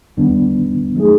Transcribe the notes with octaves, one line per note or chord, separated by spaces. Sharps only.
D#2 D#3 G3 B3 D4
F#3 A3 C4 D#4 G#4